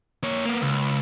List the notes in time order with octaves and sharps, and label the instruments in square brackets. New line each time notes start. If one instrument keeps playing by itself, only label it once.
[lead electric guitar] A#3 C#5
A#3 B3
C#2